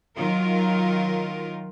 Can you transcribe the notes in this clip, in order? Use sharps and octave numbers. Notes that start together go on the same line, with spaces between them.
D#3 F#3 F4 A#4